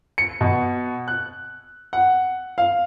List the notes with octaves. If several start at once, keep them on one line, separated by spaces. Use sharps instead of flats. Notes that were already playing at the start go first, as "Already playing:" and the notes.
C#7
B2
F#6
F#5
F5